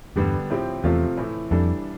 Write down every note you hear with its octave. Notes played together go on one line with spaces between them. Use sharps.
E2 G2 D3 G3 B3 D4 G4
A2 F3 C4 G4
E2 C3 F3 A3 C4 F4
A2 E3 A3
F2 E3 G3 D4 A4